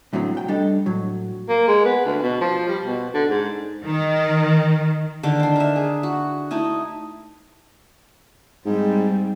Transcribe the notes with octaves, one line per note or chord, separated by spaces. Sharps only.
C2 A2 D3 F#3 C4
C2 G5
G3 D4 A4 D#5
A2 F#3
A#3
G#3
B3
D2
B2
F3
G3
B2
D3
G#2
D#3
D3 D#3 D6
D4 C5
A#4 E5
G#4
F#4
A3 D#4 E4 D#5
G#2 G3 C4